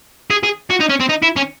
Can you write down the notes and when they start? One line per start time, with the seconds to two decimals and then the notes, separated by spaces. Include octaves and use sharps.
0.31 G#4
0.44 G#4
0.70 F#4
0.80 D#4
0.90 C#4
1.00 C4
1.09 D#4
1.23 E4
1.36 C#4